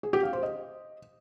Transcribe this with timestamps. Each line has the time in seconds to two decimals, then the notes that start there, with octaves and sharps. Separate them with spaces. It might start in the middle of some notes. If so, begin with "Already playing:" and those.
0.03 G#4
0.13 G4
0.23 F5
0.33 C5
0.43 D#5